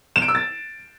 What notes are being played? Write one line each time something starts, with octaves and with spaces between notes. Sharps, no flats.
E7
D7
E6
A6